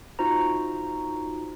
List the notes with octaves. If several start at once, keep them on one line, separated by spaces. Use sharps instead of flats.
D#4 F4 F#4 C5 A#5